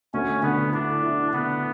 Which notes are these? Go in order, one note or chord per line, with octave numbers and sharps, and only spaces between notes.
D2 C#4
D3 B3
D4 E4
E4
D3 B3